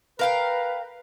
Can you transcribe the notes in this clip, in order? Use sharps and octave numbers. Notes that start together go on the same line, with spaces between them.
A#4 B4 F5 G5